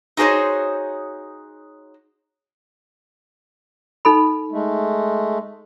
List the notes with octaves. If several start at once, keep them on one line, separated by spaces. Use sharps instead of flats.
D#4 F#4 G#4 A#4 C5 C#5
D#4 A4 B5
G#3 A3